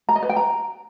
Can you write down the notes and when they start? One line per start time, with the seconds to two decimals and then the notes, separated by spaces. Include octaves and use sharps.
0.09 A#5
0.16 D#5
0.23 B4
0.29 G5
0.36 A#5